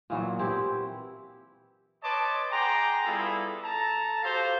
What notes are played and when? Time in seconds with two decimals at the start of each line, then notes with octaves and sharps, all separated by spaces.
0.10 A#2 E3 F#3 B3
0.39 C4 E4 G4
2.03 B4 C#5 D#5 A5 C6 D6
2.51 G#4 F#5 G5 A#5 C6 D6
3.06 G3 B3 E4 F4 G#4 A4
3.64 A4 A5 A#5
4.23 F#4 G4 A4 C5 F5